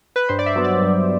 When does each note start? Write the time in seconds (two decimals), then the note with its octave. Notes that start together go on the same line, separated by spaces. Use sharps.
0.16 B4
0.29 G2 C5
0.39 D5
0.46 E5
0.56 F#3 B3
0.64 D5
0.82 G2